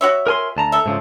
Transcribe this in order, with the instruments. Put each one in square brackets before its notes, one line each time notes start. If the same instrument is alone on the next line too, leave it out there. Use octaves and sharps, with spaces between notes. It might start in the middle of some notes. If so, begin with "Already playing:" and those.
[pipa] F#4 C#5 E5
[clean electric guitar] A#4 G#5 C6
D2 A5 A#5
[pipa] A4 E5
[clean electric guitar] G#2 C#3 F3